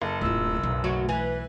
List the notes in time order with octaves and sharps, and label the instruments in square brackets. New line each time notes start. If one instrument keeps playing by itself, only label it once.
[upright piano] F#1 [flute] A4
[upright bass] D1 F4 [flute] E6
[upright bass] B1
[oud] D2 F#3 F#4
[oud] E3 [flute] B4 [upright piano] G#5